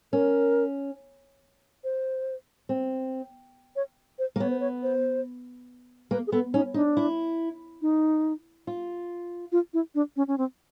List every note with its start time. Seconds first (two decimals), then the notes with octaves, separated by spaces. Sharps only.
0.13 C#4 A#4
1.84 C5
2.69 C4
3.76 C#5
4.19 C5
4.36 A#3
4.40 B3 C#5
4.50 C5
4.60 C#5
4.83 C5
6.11 A#3 B4
6.27 G#4
6.32 B3 A4
6.53 C#4 D#4
6.74 D4 D#4
6.97 E4
7.82 D#4
8.67 F4
9.52 F4
9.73 E4
9.95 D4
10.16 C#4
10.28 C#4
10.38 C4